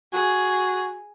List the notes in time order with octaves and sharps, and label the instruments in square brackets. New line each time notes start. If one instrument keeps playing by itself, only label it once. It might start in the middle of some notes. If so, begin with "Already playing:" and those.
[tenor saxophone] F#4 [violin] G#4